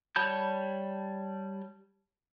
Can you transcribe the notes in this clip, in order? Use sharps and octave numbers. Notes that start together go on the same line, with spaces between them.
G3 C#5 A5 B5 G6